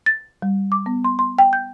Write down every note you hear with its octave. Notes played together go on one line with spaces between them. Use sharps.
A6
G3
D6
B3
C6
C6
G5
G6